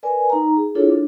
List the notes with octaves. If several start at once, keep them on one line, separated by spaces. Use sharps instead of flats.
A#4 B4 D5 G#5
D#4 A#5
G#4
D4 E4 F4 G#4 A4 C#5
D4